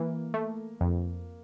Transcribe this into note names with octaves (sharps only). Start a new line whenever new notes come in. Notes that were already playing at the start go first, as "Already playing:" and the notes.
Already playing: E3 A#3
A3
F2